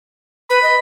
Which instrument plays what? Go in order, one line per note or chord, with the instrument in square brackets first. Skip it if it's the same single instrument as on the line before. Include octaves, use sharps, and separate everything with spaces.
[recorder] B4 [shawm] B5
[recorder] D#5